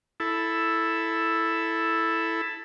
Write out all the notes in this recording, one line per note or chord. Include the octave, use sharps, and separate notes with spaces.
E4 A4